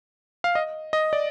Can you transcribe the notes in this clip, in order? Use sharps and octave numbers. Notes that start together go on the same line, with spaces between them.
F5
D#5
D#5
D5